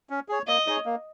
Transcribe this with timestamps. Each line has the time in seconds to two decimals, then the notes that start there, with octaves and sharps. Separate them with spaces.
0.10 C#4
0.29 G#4 C#5
0.47 A#3 D#5
0.66 D#4 G#4 C#5
0.85 A#3